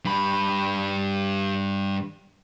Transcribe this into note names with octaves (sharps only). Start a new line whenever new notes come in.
G2 B5